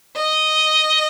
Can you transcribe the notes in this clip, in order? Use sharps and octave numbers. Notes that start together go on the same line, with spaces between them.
D#5